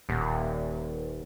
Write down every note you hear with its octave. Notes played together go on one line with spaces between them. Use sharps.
D#1